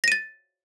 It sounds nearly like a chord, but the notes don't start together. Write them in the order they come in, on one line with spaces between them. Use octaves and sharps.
A#6 D#7 A6